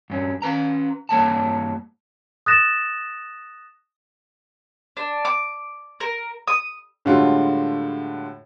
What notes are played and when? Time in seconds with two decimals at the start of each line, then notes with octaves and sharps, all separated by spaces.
0.10 G2 C#4
0.42 C#4 B4 A#5
1.09 G2 A#3 C#5 A5
2.46 D#6 F#6 A6 A#6 E7
4.97 D4
5.25 D6
6.00 A#4
6.48 D#6
7.05 A2 D3 G3 G#3 F4 F#4